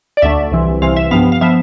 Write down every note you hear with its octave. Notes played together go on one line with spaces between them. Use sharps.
D5
D2 D3 A3 E5
C2 C3 E3
C2 C3 E3 F5
E5
G2 F3 B3 F5
F5
F3 B3 E5